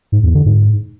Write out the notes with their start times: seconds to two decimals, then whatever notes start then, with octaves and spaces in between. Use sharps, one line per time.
0.12 G#2
0.23 E2
0.34 D3
0.46 G#2